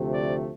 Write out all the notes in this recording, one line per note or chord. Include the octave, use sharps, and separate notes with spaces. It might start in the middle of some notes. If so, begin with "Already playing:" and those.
Already playing: D2 C3 F3 A3
D5